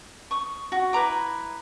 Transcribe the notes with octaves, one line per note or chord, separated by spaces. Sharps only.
C#6 D#6
F#4
E4 B4 A#5 D6